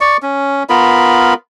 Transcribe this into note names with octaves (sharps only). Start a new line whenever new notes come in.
D5 C#6
C#4
B3 F4 A#4 B5